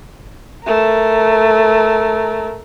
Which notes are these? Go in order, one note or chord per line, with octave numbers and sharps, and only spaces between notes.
A3 A#4